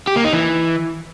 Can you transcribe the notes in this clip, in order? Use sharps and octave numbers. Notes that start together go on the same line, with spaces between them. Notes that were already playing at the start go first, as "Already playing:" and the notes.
G4
A#3
D#4
E3